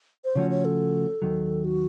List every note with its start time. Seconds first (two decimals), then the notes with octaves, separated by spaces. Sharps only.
0.25 C5
0.35 C#3 F3 A3 C#4 F#4 C#5
0.50 C#5
0.65 A4
1.22 D#2 D#3 F#3
1.65 F#4